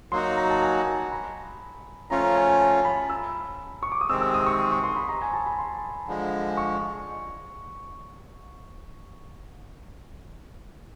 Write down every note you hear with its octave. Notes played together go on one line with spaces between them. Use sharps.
F#3 A#3 D#4 F#4 C6
A#5
A5
G#5
A#5
B5
F3 A3 C#4 F4 A#5
A#5
G#5
G#5
A5
B5
E6
C#6
D6
D#6
C3 D#3 G#3 C4 E6
E6
D#6
C#6
C6
C#6
C6
B5
A#5
G#5
A5
B5
C6
D3 F3 G#3
C#6